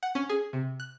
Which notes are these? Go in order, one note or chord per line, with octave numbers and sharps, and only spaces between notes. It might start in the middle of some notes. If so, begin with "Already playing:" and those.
F#5
C#4
G#4
C3
F#6